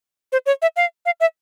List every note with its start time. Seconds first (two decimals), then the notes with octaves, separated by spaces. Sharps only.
0.32 C5
0.46 C#5
0.62 E5
0.76 F5
1.06 F5
1.20 E5